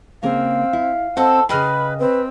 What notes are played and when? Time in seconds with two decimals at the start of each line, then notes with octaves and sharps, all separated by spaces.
0.23 C#3 A#3 C4 G#4 F5
0.73 E4
1.17 C4 A4 C5 D#5 F#5
1.49 C#3 G#4 B4 D#5 G5 B5 F6
1.99 C4 B4